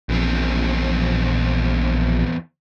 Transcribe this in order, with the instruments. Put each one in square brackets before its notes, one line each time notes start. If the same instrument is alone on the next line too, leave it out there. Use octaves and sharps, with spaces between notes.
[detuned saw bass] A#1 [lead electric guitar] E2 C4